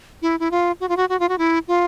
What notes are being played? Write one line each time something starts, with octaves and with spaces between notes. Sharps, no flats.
E4
E4
F4
F#4
F4
F#4
F#4
F4
F#4
E4
F4